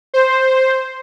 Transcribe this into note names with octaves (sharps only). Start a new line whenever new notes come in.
C5